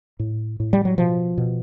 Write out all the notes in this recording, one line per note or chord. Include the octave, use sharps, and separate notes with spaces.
A2
A2
G3
F#3
B2 F3
B2